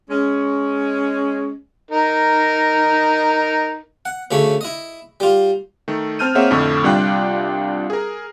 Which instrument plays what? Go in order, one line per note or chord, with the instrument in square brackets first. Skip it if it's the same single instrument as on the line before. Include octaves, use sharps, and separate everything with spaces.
[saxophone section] G#3 C#4
[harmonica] D#4 A#4
[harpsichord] F#5
D2 C#3 A3 C#5 C#6
E4 D#5
G3 F4
[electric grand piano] D#3 A3
C4 A5 F6 G6 D#7
A#3 C4 G#4 C#5 E5 F#5
F2 A2 D3 A3
C2 G3 D4 F4 G5 F#6
G#4 A#4